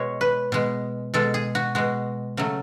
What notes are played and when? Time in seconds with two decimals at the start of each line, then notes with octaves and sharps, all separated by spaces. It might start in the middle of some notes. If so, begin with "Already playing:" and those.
Already playing: B2 G#3 C#5
0.21 B4
0.52 B2 G#3
1.14 B2 G#3 A4
1.34 G#4
1.55 F#4
1.75 B2 G#3 F#4
2.37 C#3 F#3 A3